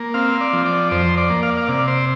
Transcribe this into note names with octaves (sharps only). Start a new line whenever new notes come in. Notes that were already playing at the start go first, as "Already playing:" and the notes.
Already playing: A#3
C4 F5
D5
F3
D5
F2 C5
D5
A#3
F5
D5
F5
C3 D5
C5